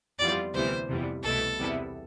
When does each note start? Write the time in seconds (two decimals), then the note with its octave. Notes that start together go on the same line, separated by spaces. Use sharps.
0.19 F2 E3 G3 B3 F4 D5
0.54 D2 C3 E3 G3 B3 C5
0.89 F2 C3 E3 G3 B3
1.23 C2 B2 A3 E4 A4
1.59 E2 C3 G3 B3 E4